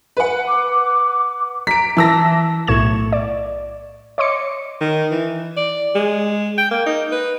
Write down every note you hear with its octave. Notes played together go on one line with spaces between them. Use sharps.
B4 F#5
D6
A#5 B6 D7
E3 A5 E6 A#6
B1 A2 C#6 G#6 E7
D5
C#5 D#5 C6 D6 C#7
D#3
E3
D5
G#3
G5
A#3
D#4
B4